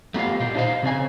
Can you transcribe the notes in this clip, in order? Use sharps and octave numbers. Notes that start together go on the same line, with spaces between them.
A3 B3 F4 G4 F5
A#2 F4 G4
D4 D#4 C5 D#5 F5
C#3 C4 D5 G#5